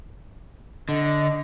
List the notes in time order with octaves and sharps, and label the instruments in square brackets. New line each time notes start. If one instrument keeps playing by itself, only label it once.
[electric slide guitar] D3 [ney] D#5